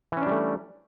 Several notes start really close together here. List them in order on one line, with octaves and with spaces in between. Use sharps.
E3 C#4 D4 G3 A3